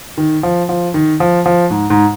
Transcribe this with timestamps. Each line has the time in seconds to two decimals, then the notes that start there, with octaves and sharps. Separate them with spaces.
0.18 D#3
0.43 F3
0.69 F3
0.94 D#3
1.20 F3
1.46 F3
1.70 G#2
1.90 G#2